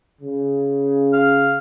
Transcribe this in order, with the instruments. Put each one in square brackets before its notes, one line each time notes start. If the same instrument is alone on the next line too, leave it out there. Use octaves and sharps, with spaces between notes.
[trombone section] C#3
[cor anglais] F5